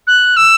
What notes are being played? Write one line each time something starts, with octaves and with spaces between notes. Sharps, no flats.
F#6
E6